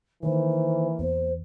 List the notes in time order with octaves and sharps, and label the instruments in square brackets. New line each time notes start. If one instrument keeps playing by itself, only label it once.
[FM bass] D#3 [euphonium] E3 [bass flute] A#3 [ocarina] C5
[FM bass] E2 [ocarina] C5